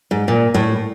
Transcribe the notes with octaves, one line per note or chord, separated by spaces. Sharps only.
G#2
A#2
A2